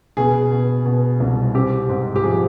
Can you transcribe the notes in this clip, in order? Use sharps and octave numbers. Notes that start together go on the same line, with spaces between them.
B2 G#4
B2
B2
C2
C4 G4
G#2
G4
F3 G#4